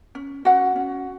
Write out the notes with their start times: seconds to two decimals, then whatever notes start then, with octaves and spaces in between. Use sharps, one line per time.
0.15 C#4
0.45 C#4 F#4 F#5
0.76 C#4